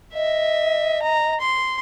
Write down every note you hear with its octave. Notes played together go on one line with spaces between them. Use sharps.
D#5 E5
A#5
C6